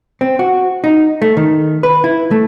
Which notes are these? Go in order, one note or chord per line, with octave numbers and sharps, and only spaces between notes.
C4
F#4
D#4
A3
D#3
B4
E4
A3